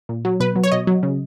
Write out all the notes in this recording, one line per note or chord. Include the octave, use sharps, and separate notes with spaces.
A#2
F#3
B2 B4
F#3
C#5
B2 D#5
F#3
C#3